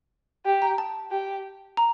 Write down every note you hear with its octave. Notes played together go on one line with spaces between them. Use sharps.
G4
A#5
A5
G4
A#5